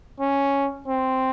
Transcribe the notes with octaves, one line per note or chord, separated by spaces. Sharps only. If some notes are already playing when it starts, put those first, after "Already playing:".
C#4
C4